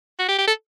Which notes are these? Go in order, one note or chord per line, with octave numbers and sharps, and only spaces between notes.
F#4
G4
G4
A4